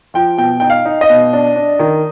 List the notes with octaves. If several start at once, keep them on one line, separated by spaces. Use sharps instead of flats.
F3 G5
B2 G5
D#4 G5
F5
D#4
D#5
B2
D4
D4
D#3